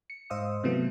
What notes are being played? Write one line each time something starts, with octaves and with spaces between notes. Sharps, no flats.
C#7
G#2 C5 D#5 F5 D#6 E6
C3 E3 F#3 A3 B3